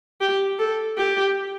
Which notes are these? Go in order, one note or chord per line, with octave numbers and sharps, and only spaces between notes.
G4
A4
G4